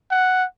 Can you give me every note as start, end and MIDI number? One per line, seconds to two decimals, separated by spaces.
0.11 0.44 78